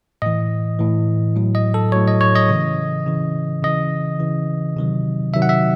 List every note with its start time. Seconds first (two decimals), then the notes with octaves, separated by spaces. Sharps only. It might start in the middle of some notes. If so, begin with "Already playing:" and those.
0.22 A2 E3 D#5
0.79 A2 E3
1.36 A2 F#3
1.55 D#5
1.74 A4
1.92 A2 F#3 C#5
2.08 D#5
2.21 C#5
2.35 D#5
2.49 C#3 E3
3.06 C#3 E3
3.63 C#3 E3 D#5
4.20 C#3 E3
4.77 C3 D#3 F#3
5.34 C3 D#3 F#3 E5
5.42 F#5
5.49 E5